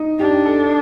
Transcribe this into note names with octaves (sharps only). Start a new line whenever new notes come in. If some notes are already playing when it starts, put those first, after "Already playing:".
Already playing: D#4
D4 G4
A4